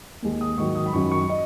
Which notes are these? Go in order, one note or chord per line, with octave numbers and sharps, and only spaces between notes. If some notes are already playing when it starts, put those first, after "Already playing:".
D#2 D#3 G#3
D#6
G#2 D#3 F#3 C#6
D#6
B5
F#2 D#3 F#3 C#6
C#6
D#5